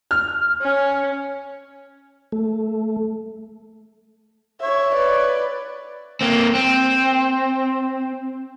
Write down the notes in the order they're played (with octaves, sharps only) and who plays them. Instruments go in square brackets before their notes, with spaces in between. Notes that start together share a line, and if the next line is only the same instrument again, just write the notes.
[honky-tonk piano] F6
[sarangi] C#4
[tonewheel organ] A3
[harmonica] C#5 [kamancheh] E5
[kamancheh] B4 D5
[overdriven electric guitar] A#3 C4
C4